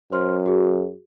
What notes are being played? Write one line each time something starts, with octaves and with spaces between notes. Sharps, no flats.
F#2 C5 C6 F6
F#4 G#4